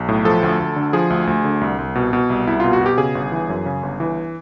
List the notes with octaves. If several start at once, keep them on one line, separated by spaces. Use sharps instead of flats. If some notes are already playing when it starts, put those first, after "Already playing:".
Already playing: B1
A2
F3 A4
D2
D2
D3
F3 G#4
D2
D2
D3
C2
C2
B2
B2
C2
C2 E4
B2 F4
F#4
B2 G4
C#3 G#4
G1
E3
F#2
C#3
G1
E3